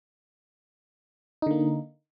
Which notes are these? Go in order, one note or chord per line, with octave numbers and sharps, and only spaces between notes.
D3 A#3 D#4